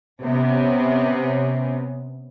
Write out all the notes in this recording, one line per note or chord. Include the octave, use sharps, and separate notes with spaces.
C3 B3 C#4